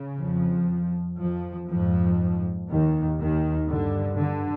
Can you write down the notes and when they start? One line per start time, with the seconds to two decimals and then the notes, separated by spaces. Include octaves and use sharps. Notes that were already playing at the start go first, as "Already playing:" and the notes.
Already playing: C#3
0.19 F2 F3
1.19 F2 F3
1.68 F2 G#2 F3
2.69 D#2 D#3
3.19 D#2 D#3
3.69 G2 D3
4.19 D3